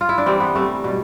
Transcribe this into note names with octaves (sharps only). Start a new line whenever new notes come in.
F4
E4
D4
C3 E3 G3 C4
B3
C3 E3 G3 A3
B2 G3